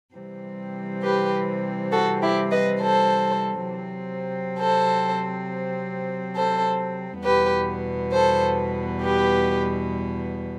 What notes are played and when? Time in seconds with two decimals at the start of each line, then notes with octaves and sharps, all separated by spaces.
0.15 C3 E3 G3 C4
1.03 G4 B4
1.92 F#4 A4
2.22 E4 G4
2.51 B4 D#5
2.80 A4 C5
3.70 C3 F#3 C4
4.58 A4 C5
6.35 A4 C5
7.24 E2 B2 G3 B3 G4 B4
8.12 A4 C5
9.01 G4 B4